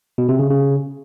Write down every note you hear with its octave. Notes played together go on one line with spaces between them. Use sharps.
B2
C3
C#3
C#3